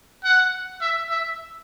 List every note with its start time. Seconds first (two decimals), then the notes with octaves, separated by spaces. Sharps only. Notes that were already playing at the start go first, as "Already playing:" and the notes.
0.24 F#5
0.81 E5
1.10 E5